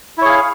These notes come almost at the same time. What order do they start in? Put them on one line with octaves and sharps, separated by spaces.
E4 C#5 G#4 F5